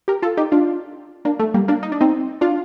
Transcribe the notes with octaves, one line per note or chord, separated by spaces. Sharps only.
G4 A#4
F4 A4
D#4 G4
D4 F4
A#3 D4
A3
G3 A#3
A#3 D4
D#4
D4
C4 D#4
D4 F4